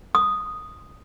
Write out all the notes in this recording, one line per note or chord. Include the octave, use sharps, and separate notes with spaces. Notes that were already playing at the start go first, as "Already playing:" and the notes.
D#6